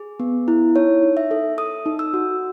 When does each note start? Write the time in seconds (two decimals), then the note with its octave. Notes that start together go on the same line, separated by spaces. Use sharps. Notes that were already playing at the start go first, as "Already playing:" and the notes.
Already playing: G#4
0.20 B3
0.48 E4
0.75 D#4 C#5
1.02 D#4
1.17 E5
1.31 A4
1.58 A4 D#6
1.86 D#4
1.99 E6
2.14 F#4